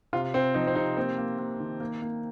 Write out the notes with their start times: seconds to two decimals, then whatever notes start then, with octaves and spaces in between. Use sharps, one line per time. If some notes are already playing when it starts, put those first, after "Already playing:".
0.13 C3 F4
0.34 C3 C4
0.54 F3 D#4
0.67 C4
0.75 C3 D#4
0.97 A#3 C4
1.18 A#3
1.39 A#3
1.60 D#3
1.80 A#3
2.02 A#3